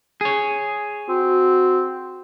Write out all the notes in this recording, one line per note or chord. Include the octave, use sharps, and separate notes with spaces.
G#4 C#5
C4 F#4